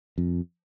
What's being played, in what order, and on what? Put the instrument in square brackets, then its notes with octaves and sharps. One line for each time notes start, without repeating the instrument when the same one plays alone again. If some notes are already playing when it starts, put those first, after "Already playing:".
[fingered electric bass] F2